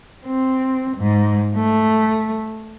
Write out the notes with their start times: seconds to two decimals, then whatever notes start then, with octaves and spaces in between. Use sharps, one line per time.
0.26 C4
0.97 G#2
1.56 A3